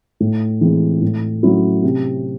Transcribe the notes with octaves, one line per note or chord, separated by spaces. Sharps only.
A2
E3 G#3 C4
A2
F#3 A3 C#4 E4
C3